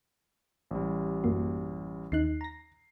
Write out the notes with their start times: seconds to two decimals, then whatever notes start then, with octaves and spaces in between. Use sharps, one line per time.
0.71 A1 G3
1.24 F#2 A#3 F#4
2.12 D#2 D#4 F#6 C7
2.41 A#5 A#6